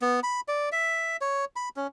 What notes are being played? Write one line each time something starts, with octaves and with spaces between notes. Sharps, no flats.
B3
B5
D5
E5
C#5
B5
C#4